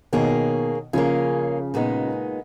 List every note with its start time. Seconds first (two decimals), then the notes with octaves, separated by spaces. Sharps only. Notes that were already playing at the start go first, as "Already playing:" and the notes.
0.13 B2 D#3 A#3 C#4 G#4
0.93 C#3 F3 A#3 C#4 G#4
1.74 A#2 G#3 B3 D#4